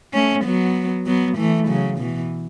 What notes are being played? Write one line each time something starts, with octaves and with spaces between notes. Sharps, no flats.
A3 C#4
F#3 B3
F#3 B3
E3 A3
C#3 F#3
B2 E3